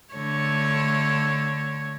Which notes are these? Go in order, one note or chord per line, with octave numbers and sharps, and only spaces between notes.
D3 A3 C#5